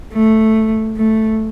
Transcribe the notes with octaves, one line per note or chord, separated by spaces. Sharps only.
A3
A3